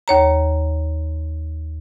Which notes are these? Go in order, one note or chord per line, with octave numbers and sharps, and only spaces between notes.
D#2 C#5 A#5